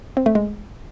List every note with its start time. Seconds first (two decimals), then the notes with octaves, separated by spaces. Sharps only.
0.17 C4
0.26 A3
0.35 G#3